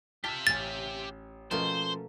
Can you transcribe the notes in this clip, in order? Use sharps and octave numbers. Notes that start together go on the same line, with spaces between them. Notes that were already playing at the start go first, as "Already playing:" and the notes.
F4 G4 E5 A5 B6
A1 C#4 F5 A6
B2 F3 A3 A#3 C#4 C5